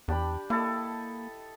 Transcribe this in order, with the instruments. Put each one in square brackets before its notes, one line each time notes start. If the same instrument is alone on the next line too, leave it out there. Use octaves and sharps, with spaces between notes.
[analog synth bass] E2 [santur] D4 G4 B5
[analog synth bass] A#3 [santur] E4 A4 D#5